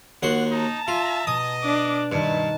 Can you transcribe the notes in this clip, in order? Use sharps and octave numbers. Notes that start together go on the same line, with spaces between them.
D#2 F#4 F#5 C6
D#4 A5 A#5
F4 E5
B2 D#5 D#6
D4 D6
G2 D#3 E4 A5 F#6